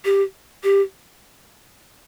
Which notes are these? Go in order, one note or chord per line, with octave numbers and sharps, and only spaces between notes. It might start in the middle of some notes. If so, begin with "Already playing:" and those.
G4
G4